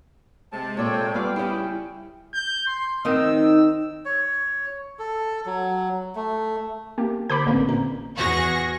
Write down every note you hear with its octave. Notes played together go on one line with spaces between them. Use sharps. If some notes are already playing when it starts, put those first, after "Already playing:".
C3 G#3 A5
A#2 A4 C#5 D5 G5
G3 B3 F4 G4 G#4 D5 F5 G5
C#3 E4 G4
G6
C6
D#3 C4 D#4 E6
C#5
A4
F#3
A3
A#3 G4
D3 C5 B5 D6 G6
A1 D3 A#3 C4 C#4 B4
A#2 A#5
E2 F#4 G#4 C#6 A#6